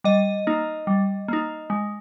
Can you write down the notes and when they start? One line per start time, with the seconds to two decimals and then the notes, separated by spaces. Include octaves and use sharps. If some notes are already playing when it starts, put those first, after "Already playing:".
0.04 G3 D#5
0.47 A#3 D#4
0.87 G3
1.28 A#3 D#4
1.70 G#3